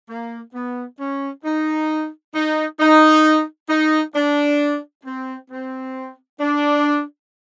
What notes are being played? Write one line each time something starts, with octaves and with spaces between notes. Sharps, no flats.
A#3
B3
C#4
D#4
D#4
D#4
D#4
D4
C4
C4
D4